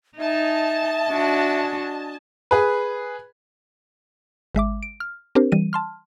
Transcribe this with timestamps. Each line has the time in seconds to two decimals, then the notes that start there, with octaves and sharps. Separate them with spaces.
0.18 D#4 D#5 E5 G#5 A5
1.11 D4 F#4
2.51 G#4 B4
4.55 G#1 G#3 E5 D6
4.83 D7
5.00 F6
5.35 C4 D4 G4 A#4 C5
5.52 E3 G3 D#7
5.73 A5 C6 F6